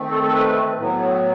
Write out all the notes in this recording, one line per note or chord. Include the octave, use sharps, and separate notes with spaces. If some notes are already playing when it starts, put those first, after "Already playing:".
Already playing: D#3 A3 C4
A4
A4
B4
A2 F#3 B3